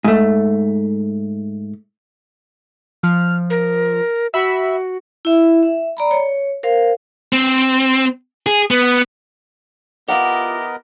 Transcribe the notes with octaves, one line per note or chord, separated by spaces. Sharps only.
G#2 A3
F3 F6
A#4
F#4 E5 B5
E4 E5
E5
D5 A#5 B5
C#5
A#4 C5 F5
C4
G#4
B3
B3 E4 F4 G4 A#4 D#5 F5 F#5